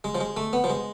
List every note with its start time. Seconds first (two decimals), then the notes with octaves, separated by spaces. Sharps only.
0.04 G#3
0.15 F3
0.21 G#3
0.37 A3
0.53 B3
0.64 F3
0.70 G#3